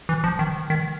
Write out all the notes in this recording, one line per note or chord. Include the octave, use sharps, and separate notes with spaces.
E3
F3
D#3
D#3